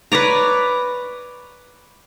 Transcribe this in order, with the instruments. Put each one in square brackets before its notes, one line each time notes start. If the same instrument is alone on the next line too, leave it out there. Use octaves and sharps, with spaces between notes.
[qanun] B4 C#5 D5 A#5